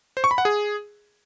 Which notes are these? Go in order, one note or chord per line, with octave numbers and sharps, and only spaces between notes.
C5
C#6
B5
F#5
G#4